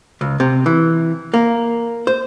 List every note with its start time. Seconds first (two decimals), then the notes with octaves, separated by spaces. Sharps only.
0.21 C#2
0.40 C3
0.66 E3
1.34 A#3
2.07 C5